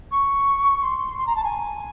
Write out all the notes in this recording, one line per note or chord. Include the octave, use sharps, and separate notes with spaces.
C#6
C6
C6
A#5
A5
G#5